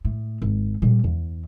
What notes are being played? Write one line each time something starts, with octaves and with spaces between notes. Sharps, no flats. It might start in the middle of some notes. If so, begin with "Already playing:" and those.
A2
G#1
A#2 G3
E2